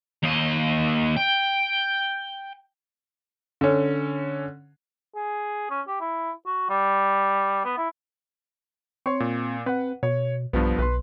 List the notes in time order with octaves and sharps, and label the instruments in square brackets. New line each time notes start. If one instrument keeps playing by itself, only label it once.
[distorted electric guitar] D#2 D#5
G5
[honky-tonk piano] D3 C#4
[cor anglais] G#4
C#4
G4
E4
F#4
G3
B3
E4
[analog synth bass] C4 [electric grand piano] C#5 C6 C#6
[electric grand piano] A#2
[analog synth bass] C4 [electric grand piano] B4 F#5
[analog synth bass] B2 [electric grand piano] C#5
[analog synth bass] B1 [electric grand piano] G2 F3 B3
[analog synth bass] B1 [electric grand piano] B4 C6